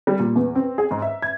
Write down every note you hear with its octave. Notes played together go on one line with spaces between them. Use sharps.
G3
A#2
E2
C4
G#4
G#2
E5
G#6